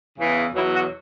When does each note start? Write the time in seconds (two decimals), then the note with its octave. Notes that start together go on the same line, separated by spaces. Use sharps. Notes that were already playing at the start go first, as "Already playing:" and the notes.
0.17 E2 C#3 E3
0.53 E2 B2 F#3 E4
0.73 F#4